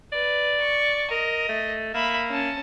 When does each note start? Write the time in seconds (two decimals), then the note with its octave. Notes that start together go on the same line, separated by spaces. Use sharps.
0.13 B4 D5
0.61 C#6
1.11 A#4 D#5
1.49 A3
1.94 A#3 E5 B5
2.30 C#4 A5